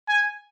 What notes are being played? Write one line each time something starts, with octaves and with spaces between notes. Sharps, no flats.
G#5